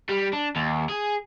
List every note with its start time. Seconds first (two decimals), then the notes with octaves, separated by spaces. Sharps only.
0.09 G3
0.33 D4
0.56 D#2
0.89 G#4